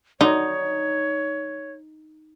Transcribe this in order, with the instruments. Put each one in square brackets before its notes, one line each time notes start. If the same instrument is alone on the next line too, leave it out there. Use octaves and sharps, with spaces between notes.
[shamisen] D3 F#3 [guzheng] D#4 [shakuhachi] C#5